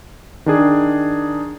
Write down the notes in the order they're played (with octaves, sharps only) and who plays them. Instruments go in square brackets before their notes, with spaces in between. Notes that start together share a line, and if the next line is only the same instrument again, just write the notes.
[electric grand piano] D#3 D4 G#4